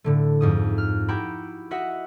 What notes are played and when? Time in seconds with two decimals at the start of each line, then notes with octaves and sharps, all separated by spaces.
0.04 A2 D3 A3
0.41 F2 G#2 D#6
0.78 F6
1.08 E4 F#4 G4 G5 A#5 B5
1.71 F#4 D#5 E5 F#5 B6